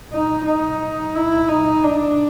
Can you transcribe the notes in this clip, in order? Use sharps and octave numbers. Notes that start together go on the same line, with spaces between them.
D#4
D#4
E4
D#4
D4